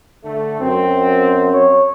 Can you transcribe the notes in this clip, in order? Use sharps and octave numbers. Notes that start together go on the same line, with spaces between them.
D3 A3
F#2 C4
C#5